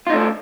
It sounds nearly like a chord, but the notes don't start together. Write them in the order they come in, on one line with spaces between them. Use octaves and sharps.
F4 D#4 A3 D4